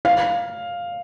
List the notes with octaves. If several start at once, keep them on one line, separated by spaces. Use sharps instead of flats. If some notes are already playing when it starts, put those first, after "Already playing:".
F5